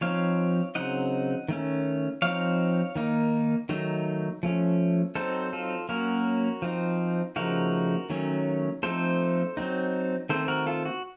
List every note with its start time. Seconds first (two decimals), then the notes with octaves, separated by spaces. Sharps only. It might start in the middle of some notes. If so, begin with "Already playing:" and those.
0.01 F3 C4 D#4 C#5 F5
0.75 C#3 F#3 C4 D#4 D#5 F#5
1.48 D#3 A3 C#4
2.22 F3 C4 D#4 C#5 F5
2.95 D#3 A#3 D#4
3.69 D#3 F#3 A3 D#4
4.43 F3 A3 C#4
5.15 F#3 C4 D#4 A4 C5
5.53 F4 A4
5.89 F#3 A#3 C#4 F#4 A#4
6.62 F3 C4 D#4
7.36 C#3 F3 A3 D#4 F#4 A#4
8.10 D#3 F#3 A3 C#4
8.83 F3 A3 C4 D#4 A4 C5
9.57 F#3 C4 D#4
10.29 D#3 A3 C4 A4 C5
10.48 F#4 A#4
10.66 F4 A4
10.85 F#4